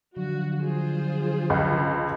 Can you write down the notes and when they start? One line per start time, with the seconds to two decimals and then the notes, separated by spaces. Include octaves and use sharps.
0.16 D3 F3 F#3 F#4
0.62 F4 G#4 C5
1.50 C#2